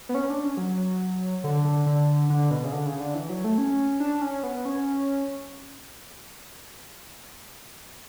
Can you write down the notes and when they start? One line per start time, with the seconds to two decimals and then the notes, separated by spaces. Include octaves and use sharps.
0.09 B3
0.14 C#4
0.30 D4
0.44 C#4
0.57 F#3
1.44 D3
1.65 D3
1.86 D3
2.30 D3
2.51 B2
2.64 C#3
2.72 D3
2.86 C#3
3.00 D3
3.14 E3
3.30 F#3
3.44 A3
3.58 C#4
4.00 D4
4.22 C#4
4.43 B3
4.65 C#4